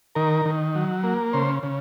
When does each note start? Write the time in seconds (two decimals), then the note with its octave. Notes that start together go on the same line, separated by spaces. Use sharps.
0.15 D#3 A#4
0.45 D#3
0.75 F#3
1.03 A#3
1.33 C#3 C5
1.63 C#3